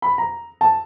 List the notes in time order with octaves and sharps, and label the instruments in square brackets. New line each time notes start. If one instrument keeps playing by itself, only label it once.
[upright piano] B5
A#5
A5